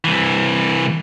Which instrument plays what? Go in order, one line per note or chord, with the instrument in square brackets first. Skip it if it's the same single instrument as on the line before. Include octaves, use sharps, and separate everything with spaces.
[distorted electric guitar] C2 E3